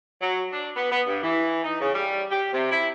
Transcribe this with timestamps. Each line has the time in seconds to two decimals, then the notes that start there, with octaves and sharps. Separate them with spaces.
0.22 F#3
0.52 D4
0.76 B3
0.91 B3
1.07 G2
1.22 E3
1.64 D#4
1.81 C#3
1.94 G3
2.31 G4
2.52 C3
2.71 E4